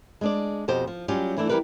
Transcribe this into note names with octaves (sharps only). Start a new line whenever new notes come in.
G#3 D4 D5
F2 B2 G4 C5
F3
F#3 G3 C#4 F4 G4
E3 A3 D4 E4
E3 G3 F#4 G4 A#4 B4